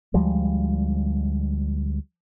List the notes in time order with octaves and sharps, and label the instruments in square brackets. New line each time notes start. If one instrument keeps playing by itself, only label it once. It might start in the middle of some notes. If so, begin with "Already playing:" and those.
[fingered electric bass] D2 F3 G3 G#3